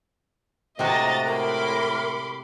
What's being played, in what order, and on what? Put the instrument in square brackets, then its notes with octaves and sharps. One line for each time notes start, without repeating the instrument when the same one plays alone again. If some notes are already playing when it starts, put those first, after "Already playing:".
[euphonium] A2 [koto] C3 G#3 F#4 [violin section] D#5 A#5 A6
[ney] A#4 [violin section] B5 C6 D6